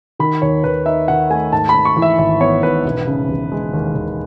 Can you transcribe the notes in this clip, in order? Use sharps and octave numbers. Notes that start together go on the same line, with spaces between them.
D#3 B5
D#2 C#5
D#2 B4
D#4 E5
D#3 F#5
A3 G#5
G#2 A5
B5
G#2
C#6
E3
E5
G#1 E5
B3 C#5
G#2 B4
E1
C#3
E1
G#3
D#2
D#2